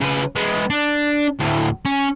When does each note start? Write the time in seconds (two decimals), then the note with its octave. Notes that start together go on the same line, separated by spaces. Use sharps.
0.01 C#3 B4
0.36 G#3 B3
0.70 D4
1.39 D2 A2
1.85 C#4